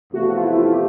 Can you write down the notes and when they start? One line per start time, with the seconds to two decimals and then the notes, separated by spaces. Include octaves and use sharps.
0.13 E2 C3 F3 A3 F#4
0.28 F#4
0.37 F4
0.44 E4
0.58 F4
0.73 G4